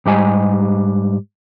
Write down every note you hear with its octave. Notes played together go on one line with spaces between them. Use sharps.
G#2 G3 G4 D#5 G#5